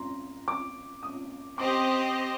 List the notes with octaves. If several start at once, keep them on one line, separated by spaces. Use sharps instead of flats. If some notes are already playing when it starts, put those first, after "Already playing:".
Already playing: A#5 C6
D6
D#6
C4 G4 C5 D#5 D6